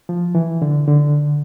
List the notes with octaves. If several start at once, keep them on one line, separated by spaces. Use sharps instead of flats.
F3
E3
D3
D3